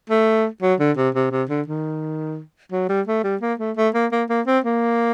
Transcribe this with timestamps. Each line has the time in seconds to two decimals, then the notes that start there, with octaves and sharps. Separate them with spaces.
0.10 A3
0.62 F#3
0.79 D3
0.97 C3
1.15 C3
1.31 C3
1.49 D3
1.68 D#3
2.72 F#3
2.89 G3
3.07 A3
3.24 G3
3.41 A#3
3.59 A3
3.77 A3
3.94 A#3
4.12 A#3
4.29 A#3
4.47 C4
4.64 A#3